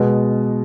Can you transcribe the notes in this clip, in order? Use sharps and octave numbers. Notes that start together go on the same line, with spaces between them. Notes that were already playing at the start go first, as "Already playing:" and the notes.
Already playing: B2 G#3 B3